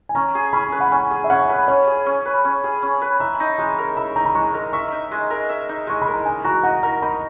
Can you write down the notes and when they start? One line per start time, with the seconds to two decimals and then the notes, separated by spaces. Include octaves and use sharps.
0.09 G#5
0.15 C#4 A#5
0.35 G#4
0.53 C#4 B5
0.72 B4
0.80 F#5
0.91 C#4 G#5
1.11 G#4
1.24 E5
1.30 C#4 F#5
1.49 B4
1.68 C#4 C#5
1.87 G#4
2.06 C#4
2.25 B4
2.45 C#4
2.64 G#4
2.82 C#4
3.02 B4
3.20 E5 A#5
3.40 D#4
3.59 G#3 A#5
3.78 A#4
3.97 E5 B5
4.16 D#4 A#5
4.25 B5
4.35 G#3 C#6
4.54 A#4
4.73 E5 C#6
4.92 D#4
5.11 G#3
5.30 A#4
5.49 E5
5.69 D#4
5.87 G#3 C#6
6.02 B5
6.07 A#4
6.14 A#5
6.25 D#4 G#5
6.44 F#4 A#5
6.63 D#4 F#5
6.83 A#4 A#5
7.02 D#4 B5